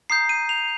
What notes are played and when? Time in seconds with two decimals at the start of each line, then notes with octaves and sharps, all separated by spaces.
0.10 A#5 D#6 G6 C7
0.29 D#7
0.49 F7